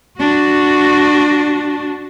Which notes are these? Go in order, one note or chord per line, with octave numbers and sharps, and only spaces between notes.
D4 F#4